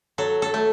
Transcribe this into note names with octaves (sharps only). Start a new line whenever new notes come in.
F#3 A4
A4
A3